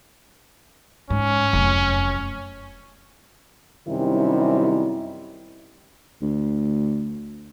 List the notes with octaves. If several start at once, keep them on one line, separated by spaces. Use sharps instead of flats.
G#2 C#4
F1 F#2
F#2 C3 D#3 G3 C#4 E4
D2